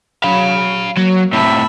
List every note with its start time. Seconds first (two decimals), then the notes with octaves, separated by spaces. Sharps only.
0.24 F#3 F5 B5
0.97 F#3 A#3
1.33 A2 C3 E5 A5 B5